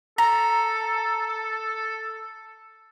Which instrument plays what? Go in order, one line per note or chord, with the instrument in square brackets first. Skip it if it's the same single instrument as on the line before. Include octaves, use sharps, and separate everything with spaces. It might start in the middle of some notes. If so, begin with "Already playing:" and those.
[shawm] A4 [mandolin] A#5